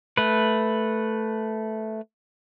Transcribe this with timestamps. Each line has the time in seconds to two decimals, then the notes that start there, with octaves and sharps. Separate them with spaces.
0.17 A3 B4